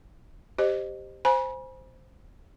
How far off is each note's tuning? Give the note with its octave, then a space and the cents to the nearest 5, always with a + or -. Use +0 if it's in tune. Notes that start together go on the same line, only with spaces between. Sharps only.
G4 +0 C5 +0 D#5 -20
C5 -5 G#5 +0 B5 -40